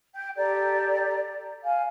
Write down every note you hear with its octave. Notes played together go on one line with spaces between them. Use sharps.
G5 G6
G4 A4 D5 A#5
F5 G#5